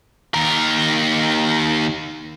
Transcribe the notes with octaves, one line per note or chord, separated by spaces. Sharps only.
D#2 A#4